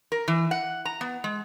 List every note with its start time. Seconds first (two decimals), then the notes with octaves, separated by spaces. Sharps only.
0.12 A#4
0.28 E3
0.51 F#5
0.85 A#5
1.01 B3
1.24 G#3